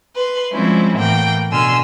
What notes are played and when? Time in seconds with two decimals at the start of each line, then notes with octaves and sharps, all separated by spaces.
0.15 B4 C6
0.52 F3 G3 G#3 C4 C#4 E4
0.96 A2 E3 A#3 F#5 G5
1.51 B2 D3 G#5 C6 E6 F6